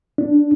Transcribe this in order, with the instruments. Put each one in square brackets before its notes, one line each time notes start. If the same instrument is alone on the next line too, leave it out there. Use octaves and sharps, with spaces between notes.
[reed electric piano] D4